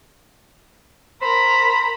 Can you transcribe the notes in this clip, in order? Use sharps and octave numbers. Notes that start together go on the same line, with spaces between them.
A#4 C5 A#5 B5